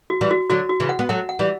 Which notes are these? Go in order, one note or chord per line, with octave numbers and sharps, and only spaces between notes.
F#4
E3 G3
F#4
D3 F#3 F#4
F#4
C#3 E3
F#5
B3
F#3 A3 F#5
F#5
E3 G3